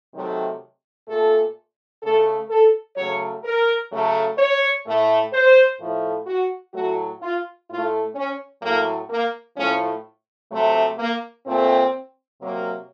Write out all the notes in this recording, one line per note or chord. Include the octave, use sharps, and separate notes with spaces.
C3 D#3 F#3 A3
A#2 A3 A4
C#3 A3 A4
A4
C#3 F#3 A3 C#5
A#4
C#3 F#3 A3
C#5
A2 A3
C5
A2 F3 A3
F#4
A2 F#3 A3 F#4
F4
A2 A3 F4
C#4
A2 F#3 A3 A#3
A#3
A2 F3 A3 C#4
C3 F#3 A3
A#3
A#2 A3 C4
C3 F#3 A#3